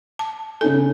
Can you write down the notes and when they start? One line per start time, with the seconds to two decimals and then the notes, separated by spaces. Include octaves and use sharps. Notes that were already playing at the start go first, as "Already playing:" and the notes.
0.19 A5
0.61 C#3 D#4 A4 G#5